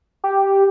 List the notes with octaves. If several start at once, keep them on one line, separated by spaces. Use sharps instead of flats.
G4